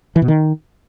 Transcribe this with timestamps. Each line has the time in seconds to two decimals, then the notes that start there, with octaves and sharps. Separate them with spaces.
0.16 E3
0.22 B2
0.28 D#3